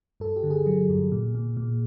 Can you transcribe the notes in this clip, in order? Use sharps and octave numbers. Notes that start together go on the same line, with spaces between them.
G2 A4
G4
D3
G#4
F#3 G#4
G2
A#2
A#2
A#2